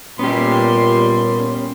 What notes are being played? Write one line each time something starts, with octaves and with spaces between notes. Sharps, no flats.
A#2 G3 B3 C#4 G4 C6